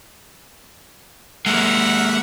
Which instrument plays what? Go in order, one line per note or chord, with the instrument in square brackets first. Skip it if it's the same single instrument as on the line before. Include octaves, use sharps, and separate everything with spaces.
[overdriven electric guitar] G#3 A#3 [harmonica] A#4 E5 F#5